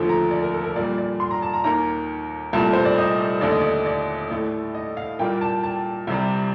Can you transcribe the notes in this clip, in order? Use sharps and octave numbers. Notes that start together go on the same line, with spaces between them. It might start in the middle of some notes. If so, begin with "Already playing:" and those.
Already playing: D#2 D3 F3 A3
A#5
D5
A#4
A4
A#4
A#2 G3 A#3 D5
D5
C6
A#5
A5
A#5
D#2 D#3 A#3 A#5
C2 A#2 A3 A5
C5
D5
D#5
D#2 D3 A3 D5
D#5
D5
D5
A2 A3
D#5
F5
A#2 G3 A#3 G5
A5
A5
C2 C3 G3